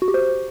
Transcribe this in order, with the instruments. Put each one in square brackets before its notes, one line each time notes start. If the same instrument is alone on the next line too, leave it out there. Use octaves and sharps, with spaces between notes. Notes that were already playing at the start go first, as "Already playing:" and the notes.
[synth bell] F#4
G4
C5